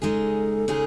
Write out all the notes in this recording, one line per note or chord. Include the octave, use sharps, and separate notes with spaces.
C#3 G#3 D#4 G#4 A4
C#3 G#3 D#4 G#4